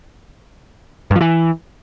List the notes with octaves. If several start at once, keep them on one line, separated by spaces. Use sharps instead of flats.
G2
F3
E3